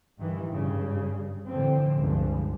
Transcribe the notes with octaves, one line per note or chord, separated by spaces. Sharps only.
G2 D#3 E3
G2 C#3
A2 D3 E3 F3 C4
C#2 G2 D3 E3 F3